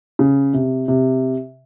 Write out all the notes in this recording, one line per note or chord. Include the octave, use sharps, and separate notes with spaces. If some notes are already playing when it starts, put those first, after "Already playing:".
C#3
C3
C3